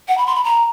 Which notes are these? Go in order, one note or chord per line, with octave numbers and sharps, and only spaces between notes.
F#5
B5
C6
B5
A#5